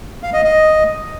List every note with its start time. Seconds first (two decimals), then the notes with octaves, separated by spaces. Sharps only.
0.23 F5
0.33 D#5
0.44 D#5